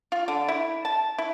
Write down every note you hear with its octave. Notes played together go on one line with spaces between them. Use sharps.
F4
D3
E4
A5
E4